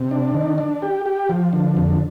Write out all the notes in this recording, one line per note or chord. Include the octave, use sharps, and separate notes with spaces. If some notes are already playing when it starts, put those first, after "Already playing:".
Already playing: C3
D4
D#3
D4
G4
G4
F3
D3
F2